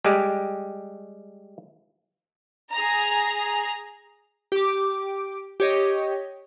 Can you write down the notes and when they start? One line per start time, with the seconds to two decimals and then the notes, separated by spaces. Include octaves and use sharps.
0.05 G3 G#3 G4
2.71 G#4 A#5
4.52 G4 D6
5.60 G4 C#5 D#5